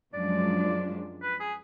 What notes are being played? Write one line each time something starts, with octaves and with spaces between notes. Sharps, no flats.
F#2 F3 G#3 D4 D5
B4
G#4